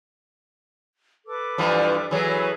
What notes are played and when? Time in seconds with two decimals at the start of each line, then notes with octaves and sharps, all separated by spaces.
1.26 A4 B4 D6
1.58 G2 E3 F3
2.11 E3 F#3 G#4 A4 B4